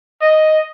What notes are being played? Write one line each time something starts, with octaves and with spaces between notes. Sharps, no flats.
D#5